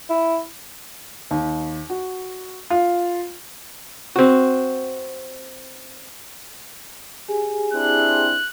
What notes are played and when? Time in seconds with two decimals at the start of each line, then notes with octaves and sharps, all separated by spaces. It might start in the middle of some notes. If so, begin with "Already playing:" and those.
0.10 E4
1.31 D#2
1.90 F#4
2.70 F4
4.16 C4 F#4
7.28 G4 G#4 G#5
7.73 C4 D4 E4 F#6